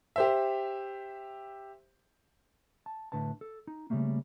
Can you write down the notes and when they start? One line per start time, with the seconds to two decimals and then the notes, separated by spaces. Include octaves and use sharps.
0.16 G4 C5 E5
2.86 A5
3.12 A2 D3 B4 A5
3.41 A4
3.67 D#4
3.90 C#3 E3 G3 A3 A#3